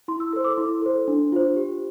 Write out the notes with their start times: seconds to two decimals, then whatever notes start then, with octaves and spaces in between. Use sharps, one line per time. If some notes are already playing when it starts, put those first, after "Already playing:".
0.08 E4 C6
0.20 E6
0.33 A4 C5 E6
0.44 D6
0.57 E4 C6
0.82 A4 C5
1.08 D4
1.32 F4 C5
1.57 G4